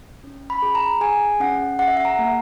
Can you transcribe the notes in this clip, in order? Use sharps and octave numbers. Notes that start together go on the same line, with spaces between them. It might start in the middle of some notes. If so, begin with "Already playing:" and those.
C#4
B5
G#4
A#5
G#4 G#5
C#4 F#5
G#4 F#5
E5
F#5
A#5
A#3